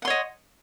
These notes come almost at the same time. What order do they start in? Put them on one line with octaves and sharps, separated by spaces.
F#5 C6 C#5 D#5